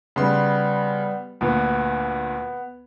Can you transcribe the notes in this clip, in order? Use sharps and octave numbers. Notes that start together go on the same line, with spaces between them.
C#3 G3 B3 C6
D2 A#2 B3